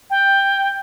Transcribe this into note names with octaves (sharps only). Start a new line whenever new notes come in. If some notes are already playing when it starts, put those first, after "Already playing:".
G5